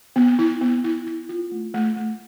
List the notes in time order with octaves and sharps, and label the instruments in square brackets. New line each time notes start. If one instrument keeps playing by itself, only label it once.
[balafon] B3
E4
B3
E4
E4
F4
A3
A3
A3